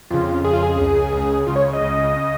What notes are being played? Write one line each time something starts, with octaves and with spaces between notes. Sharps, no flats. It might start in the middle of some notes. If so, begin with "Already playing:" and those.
F2 C#3 F4
F2 C#3 G#4
F4
G#4
C#2 C#3
C#2 C#3
C#2 C#3 F4
C#5
D#5
C#2 C#3
C#3